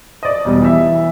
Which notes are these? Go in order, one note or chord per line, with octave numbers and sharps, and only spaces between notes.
D5 D#5
E1 G3
E3 E5